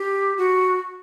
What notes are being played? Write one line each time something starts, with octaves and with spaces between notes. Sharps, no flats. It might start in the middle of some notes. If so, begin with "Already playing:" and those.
Already playing: G4
F#4